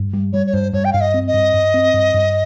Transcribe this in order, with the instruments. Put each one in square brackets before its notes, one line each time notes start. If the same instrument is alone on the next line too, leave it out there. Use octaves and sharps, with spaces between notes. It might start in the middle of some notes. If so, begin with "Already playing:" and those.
Already playing: [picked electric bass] G2
G3
[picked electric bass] G3 [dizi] C#5
[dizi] C#5
[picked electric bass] G2 [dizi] C5
[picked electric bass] G2 [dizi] C#5
[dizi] G5
[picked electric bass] G2 [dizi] F5
[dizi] D#5
[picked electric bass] C4
[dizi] D#5
[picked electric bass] G2
G2
C4
G2
G2